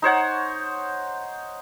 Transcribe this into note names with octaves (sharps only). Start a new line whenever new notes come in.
D#4 C5 C#5 F#5